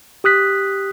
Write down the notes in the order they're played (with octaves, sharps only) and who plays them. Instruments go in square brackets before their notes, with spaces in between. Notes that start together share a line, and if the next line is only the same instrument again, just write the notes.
[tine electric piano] G4 D#6 F#6 B6